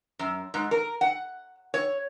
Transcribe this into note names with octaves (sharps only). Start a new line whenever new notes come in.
F#2
G#2
A#4
F#5
C#5